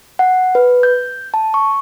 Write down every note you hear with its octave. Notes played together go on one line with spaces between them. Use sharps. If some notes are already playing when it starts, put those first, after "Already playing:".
F#5
B4
G6
A5
C#6